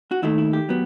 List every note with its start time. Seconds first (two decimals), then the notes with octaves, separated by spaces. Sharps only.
0.11 F#4
0.22 D#2 D#3 A3 E4
0.38 E4
0.53 G4
0.69 F#3 B3